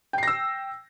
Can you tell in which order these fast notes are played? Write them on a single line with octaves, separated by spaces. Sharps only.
G5 C7 A#6 E6